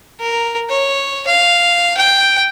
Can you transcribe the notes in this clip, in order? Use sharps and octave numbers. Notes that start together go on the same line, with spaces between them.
A#4
C#5
F5
G5